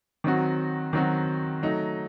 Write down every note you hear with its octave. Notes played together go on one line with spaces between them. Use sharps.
D#3 F#3 C4 F#4
D#3 F#3 C4 F#4
F#3 A3 D#4